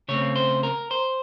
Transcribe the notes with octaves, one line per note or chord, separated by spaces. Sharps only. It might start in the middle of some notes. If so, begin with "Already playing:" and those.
C#3 A3 C4 C#5
C5
A#4
C5